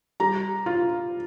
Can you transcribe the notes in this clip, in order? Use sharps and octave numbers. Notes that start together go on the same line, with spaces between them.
G3 A#5
F4